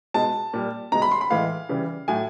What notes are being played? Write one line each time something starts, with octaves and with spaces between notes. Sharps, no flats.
B2 G#3 A5
A#2 G3
B2 G#3 A#5
B5
C6
B5
A2 E3 G#3 F5
C#3 E3 G3
A2 F#3 G#5